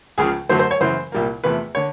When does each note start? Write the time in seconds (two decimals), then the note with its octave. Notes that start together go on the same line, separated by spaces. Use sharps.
0.18 C#2 C#3 F3 G#4
0.49 F#2 D3 F#3 A3 C5
0.59 C5
0.71 C#5
0.80 F#2 C#3 E3 C5
1.12 C2 A#2 G3 A#3
1.44 E2 C3 F3 A3 B4
1.75 D3 C#5